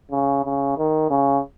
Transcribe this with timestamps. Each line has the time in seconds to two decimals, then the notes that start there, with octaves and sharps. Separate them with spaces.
0.11 C#3
0.44 C#3
0.78 D#3
1.10 C#3